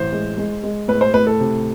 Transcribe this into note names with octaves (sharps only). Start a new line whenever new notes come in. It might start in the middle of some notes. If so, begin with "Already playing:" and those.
Already playing: A1 C5
G#3
G#3
G#3
A2 B4
C5
A2 B4
A4
C3